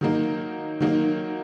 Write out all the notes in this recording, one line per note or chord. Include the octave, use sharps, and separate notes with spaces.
D#3 F#3 A#3 D#4
D#3 F#3 A#3 D#4